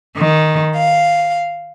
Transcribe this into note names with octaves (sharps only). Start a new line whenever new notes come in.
D#3
F5